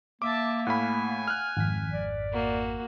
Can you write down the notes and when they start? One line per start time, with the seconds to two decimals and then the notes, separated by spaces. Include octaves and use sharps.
0.22 A#3 E5 A5 D6
0.67 A2 A3 F5 F#5 G#5 B5
1.28 F6 F#6
1.57 G#1 F2 B6
1.93 D5
2.32 A#3 F#4